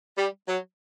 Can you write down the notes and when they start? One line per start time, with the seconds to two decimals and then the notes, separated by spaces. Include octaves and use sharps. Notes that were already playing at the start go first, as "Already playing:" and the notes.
0.16 G3
0.47 F#3